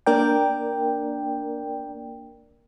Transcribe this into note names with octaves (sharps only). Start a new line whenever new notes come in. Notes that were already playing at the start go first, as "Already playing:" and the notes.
A#3 D4 A#4 D5 G5